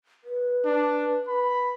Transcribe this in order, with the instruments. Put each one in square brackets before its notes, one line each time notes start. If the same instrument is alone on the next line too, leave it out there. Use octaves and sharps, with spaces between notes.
[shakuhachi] B4
[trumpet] D4
B5